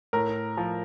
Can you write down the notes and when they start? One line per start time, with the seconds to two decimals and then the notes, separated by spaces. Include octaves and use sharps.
0.13 A2 A#4
0.57 F3